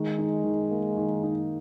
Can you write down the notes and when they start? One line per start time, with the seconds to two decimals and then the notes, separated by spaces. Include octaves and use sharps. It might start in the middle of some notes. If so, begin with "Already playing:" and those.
Already playing: D#3 G#3
0.18 D#4
0.44 D#3
0.71 A#3
0.97 D#3
1.23 D#4